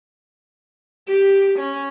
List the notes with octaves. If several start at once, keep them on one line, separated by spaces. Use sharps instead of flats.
G4
C#4